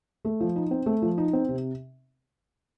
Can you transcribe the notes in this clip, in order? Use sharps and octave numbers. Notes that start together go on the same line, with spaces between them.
A3
F3
D#4
C4
A3
F3
D#4
C4
C3